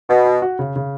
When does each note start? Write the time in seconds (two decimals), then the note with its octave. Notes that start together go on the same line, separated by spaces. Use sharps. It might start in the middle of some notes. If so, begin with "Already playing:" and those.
0.09 B2 F#4
0.26 F#4
0.42 F#4
0.59 C#3
0.76 C#3